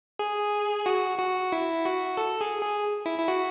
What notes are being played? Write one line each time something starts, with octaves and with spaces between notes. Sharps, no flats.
G#4
F#4
F#4
E4
F#4
A4
G#4
G#4
E4
E4
F#4